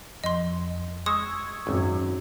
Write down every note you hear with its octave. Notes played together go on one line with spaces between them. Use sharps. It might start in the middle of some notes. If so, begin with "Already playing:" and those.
F2 D#5 C6
G#3 C#6 D#6 E6 G#6
G#1 F#2